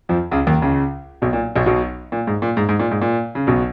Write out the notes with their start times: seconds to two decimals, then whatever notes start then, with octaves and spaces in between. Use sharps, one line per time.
0.09 F2 F3
0.31 C#2 C#3
0.47 D#2 D#3
0.62 C#2 C#3
1.22 B1 B2
1.33 A#2
1.56 B1 B2
1.66 B1 B2
2.12 A#2
2.27 G#2
2.42 A#2
2.57 G#2
2.69 G#2
2.80 A#2
2.91 G#2
3.02 A#2
3.35 C#3
3.47 B1 B2